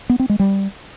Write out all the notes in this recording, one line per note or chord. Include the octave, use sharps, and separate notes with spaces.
B3
C4
G#3
G3